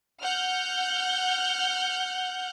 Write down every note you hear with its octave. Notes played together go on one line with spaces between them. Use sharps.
F#5 F6 G6